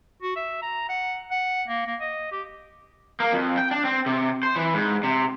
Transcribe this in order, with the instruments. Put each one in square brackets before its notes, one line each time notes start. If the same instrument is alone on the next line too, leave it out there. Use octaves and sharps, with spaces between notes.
[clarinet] F#4
E5
A#5
F#5
F#5
A#3
A#3
D#5
G4
[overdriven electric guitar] A#3
F2
G5
D4
C4
C3
C5
E3
G#2
C3